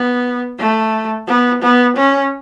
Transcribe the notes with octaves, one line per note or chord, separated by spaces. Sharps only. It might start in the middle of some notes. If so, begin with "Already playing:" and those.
Already playing: B3
A3
B3
B3
C#4